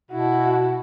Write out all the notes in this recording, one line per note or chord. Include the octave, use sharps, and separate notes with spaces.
B2 E4 F#4